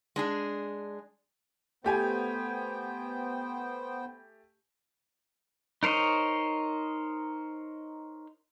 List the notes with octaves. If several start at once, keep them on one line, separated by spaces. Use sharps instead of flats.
G#3 D4 G#4
A3 B3 G4 C5 G5 G#5
D#4 A#4 C5 C#5 D#5